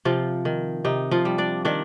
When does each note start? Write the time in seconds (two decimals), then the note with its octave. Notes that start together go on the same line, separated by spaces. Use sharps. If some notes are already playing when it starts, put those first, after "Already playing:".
0.05 C3 F3 F4
0.45 D#3
0.85 C3 D#4
1.11 F3 F4
1.25 G3
1.38 D4 D5
1.65 D#3 D4 D5